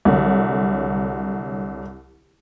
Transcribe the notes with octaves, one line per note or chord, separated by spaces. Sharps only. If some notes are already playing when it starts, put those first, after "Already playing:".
C2 D3 F#3